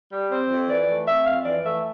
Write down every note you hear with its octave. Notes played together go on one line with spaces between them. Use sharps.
G3
C4 C5
F2
E3 D5
A3
C4 E5
F2 F5
E3 D5
A3 E5